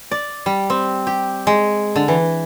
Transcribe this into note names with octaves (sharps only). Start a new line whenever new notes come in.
D5
G3
C4
G4
G#3
D3
E3